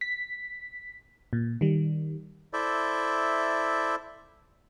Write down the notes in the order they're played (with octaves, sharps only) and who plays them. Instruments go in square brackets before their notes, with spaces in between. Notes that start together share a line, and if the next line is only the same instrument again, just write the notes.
[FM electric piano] B6
A#2
D#3 G3
[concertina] E4 A4 C5 D5 E5